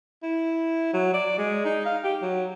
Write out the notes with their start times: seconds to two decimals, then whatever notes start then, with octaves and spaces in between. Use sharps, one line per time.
0.23 E4
0.94 F#3
1.14 D5
1.38 G#3
1.65 D#4
1.86 F5
2.04 G4
2.22 F#3